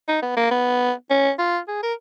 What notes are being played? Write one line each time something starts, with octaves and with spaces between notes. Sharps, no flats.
D#4
B3
A#3
B3
C#4
F4
G#4
A#4